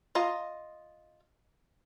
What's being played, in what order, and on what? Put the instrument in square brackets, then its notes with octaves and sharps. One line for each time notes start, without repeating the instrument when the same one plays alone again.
[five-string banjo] F4 D#5 A#5